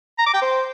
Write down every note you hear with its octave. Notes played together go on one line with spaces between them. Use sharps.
A#5
D6
G5
C5